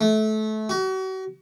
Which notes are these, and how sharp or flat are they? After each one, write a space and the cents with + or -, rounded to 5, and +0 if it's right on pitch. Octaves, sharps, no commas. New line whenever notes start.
A3 -25
F#4 +40